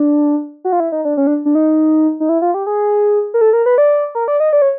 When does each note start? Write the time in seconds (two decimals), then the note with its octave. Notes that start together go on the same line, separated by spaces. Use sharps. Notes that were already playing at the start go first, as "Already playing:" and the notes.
Already playing: D4
0.65 F#4
0.72 F4
0.80 E4
0.92 D#4
1.05 D4
1.17 C#4
1.27 D4
1.46 D4
1.55 D#4
2.20 D#4
2.29 E4
2.42 F4
2.54 G4
2.67 G#4
3.34 A#4
3.41 A4
3.53 A#4
3.66 B4
3.78 D5
4.15 A#4
4.28 D5
4.40 D#5
4.53 D5
4.62 C#5